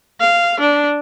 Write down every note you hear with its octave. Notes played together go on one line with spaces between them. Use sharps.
F5
D4